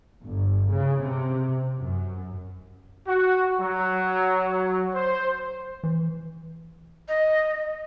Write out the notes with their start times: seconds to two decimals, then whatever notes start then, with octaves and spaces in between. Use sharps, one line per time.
0.24 G1
0.73 C#3
1.03 C3
1.80 F#2
3.08 F#4
3.60 F#3
4.94 C5
5.83 E3
7.08 D#5